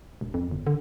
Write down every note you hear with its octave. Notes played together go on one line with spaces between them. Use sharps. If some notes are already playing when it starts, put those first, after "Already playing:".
E1
F2
G1
D3